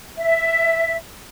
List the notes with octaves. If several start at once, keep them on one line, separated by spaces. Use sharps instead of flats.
E5